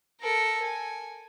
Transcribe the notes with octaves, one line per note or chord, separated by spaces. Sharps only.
A4 A#4
G#5